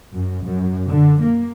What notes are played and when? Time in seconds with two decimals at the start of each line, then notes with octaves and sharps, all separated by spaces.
0.12 F#2
0.42 F#2
0.89 D3
1.21 A#3